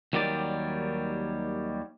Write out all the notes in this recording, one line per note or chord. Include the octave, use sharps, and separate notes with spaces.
D#2 D#3 F#3 G3 G4 D5